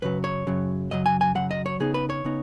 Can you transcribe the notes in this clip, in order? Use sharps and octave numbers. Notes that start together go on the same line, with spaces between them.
F#2 C#3 F#3 B4
C#5
F#2 C#3 F#3
F#2 C#3 F#3 D#5
G#5
G#5
F#2 C#3 F#3 F#5
D#5
C#5
C#3 B3 D#4 G#4
B4
C#5
C#3 B3 D#4